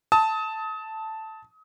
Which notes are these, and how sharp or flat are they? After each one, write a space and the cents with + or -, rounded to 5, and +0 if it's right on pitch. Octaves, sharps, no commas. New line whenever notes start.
A5 +0 D#6 +35